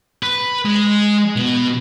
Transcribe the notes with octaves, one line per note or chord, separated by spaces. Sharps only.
B4
G#3
B2